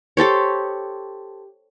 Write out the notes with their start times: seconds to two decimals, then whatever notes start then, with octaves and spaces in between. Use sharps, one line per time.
0.17 G4 A4 C5 C#5